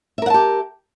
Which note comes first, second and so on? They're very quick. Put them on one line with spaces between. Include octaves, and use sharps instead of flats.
E5 A#4 F#5 A5 G4